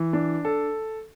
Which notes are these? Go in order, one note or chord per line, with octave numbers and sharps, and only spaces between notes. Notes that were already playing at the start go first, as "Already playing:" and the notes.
Already playing: E3
D4
A4